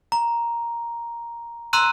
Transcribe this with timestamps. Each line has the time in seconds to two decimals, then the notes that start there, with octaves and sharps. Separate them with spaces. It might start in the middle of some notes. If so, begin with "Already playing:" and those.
0.12 A#5
1.73 A#5 C6 E6 F#6 D#7